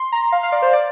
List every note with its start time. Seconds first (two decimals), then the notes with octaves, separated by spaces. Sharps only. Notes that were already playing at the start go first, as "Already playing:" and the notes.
Already playing: C6
0.12 A#5
0.32 F5
0.43 F5
0.52 D5
0.62 C5
0.73 D5